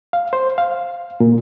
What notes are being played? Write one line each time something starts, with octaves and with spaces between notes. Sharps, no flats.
F5
C5
F5
A#2